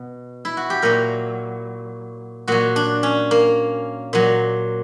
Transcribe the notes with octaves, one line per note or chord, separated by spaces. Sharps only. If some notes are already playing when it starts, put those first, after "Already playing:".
Already playing: B2
E4
F#4
G4
A#2 F#3 A#4
A#2 F#3 F#4
D4
C#4
A#3
A#2 F#3